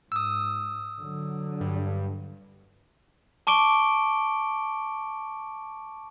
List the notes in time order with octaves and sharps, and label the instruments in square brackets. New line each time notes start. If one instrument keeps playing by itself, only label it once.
[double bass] G#2 [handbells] D#6 E6
[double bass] D3 F#3
[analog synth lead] G2
[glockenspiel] A5 C#6 D6 D7 G7